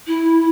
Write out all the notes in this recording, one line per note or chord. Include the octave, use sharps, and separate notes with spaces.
E4